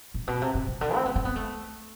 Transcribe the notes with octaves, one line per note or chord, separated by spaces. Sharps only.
A2
B2
C3
C3
C3
D3
C4
B3
C4
B3
A3